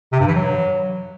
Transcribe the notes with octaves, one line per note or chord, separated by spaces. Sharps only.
C3
G2
E3
F#3